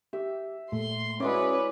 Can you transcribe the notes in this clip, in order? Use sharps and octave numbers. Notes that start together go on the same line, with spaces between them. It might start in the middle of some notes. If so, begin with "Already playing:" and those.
G4 E5
A#2 A3 C6
G#3 C#4 E4 F#4 B4 C#5 D5